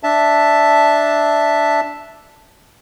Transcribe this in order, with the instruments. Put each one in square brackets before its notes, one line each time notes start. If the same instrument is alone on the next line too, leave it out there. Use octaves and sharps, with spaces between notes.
[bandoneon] D4 E5 A5